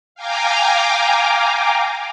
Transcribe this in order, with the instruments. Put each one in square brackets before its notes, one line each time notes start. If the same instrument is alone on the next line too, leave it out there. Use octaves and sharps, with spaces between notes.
[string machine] F5 G5 G#5 A#5 D6